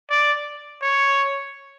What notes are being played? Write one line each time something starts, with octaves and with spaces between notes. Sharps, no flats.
D5
C#5